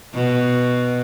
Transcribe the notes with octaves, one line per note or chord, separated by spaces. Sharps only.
B2